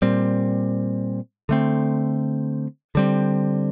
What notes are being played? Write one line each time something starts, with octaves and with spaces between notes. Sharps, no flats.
A#2 G3 C4
D3 A3 C4
D3 G3 C4